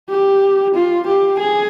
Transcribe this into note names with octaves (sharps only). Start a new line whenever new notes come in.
G4
F4
G4
G#4